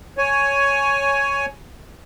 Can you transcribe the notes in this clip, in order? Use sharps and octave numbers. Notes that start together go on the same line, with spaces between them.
C#5 G#5